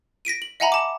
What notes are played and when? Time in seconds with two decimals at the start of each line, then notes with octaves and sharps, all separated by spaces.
0.25 A#6 B6 D7 D#7
0.42 F#7
0.60 D#5 E5 F#5 G#5 A#5 B5
0.72 A5 D6